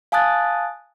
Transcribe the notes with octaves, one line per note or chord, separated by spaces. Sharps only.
F5 G#5 A5 D#6 F#6 A6